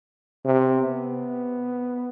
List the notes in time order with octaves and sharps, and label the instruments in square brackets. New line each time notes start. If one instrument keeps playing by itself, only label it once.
[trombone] C3
[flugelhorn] B3